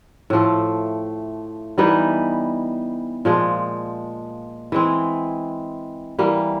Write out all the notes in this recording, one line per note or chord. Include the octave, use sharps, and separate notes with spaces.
A2 F3 A3
E3 G3 B3 D#4
A#2 F3 G#3
E3 G#3 C4
E3 G3 A#3